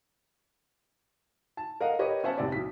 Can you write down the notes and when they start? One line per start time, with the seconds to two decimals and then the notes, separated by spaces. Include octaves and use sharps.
1.57 A5
1.81 A#4 D#5 F5 F#5
1.99 G4 A#4 B4 C#5 D#5
2.23 B3 C#4 C5 E5 F#5 A5
2.38 F1 C3 D5
2.52 B1 B6